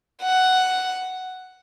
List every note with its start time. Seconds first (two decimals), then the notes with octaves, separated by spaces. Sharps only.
0.23 F#5